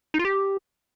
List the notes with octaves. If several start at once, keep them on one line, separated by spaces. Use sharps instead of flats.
D#4
F4
G4